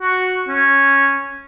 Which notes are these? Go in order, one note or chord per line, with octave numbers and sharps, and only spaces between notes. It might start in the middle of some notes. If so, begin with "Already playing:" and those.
F#4
C#4